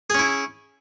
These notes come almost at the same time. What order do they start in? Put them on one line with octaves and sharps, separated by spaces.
G#4 C#4 E4